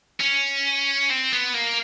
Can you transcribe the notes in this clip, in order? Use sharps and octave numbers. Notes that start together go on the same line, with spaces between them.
C#4
C4
B3
A#3